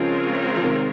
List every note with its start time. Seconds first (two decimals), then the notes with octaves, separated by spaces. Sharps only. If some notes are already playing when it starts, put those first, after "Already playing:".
Already playing: C#3 F3 G#3 C4 F4 A#4 C#5
0.56 F3
0.63 C3 D#3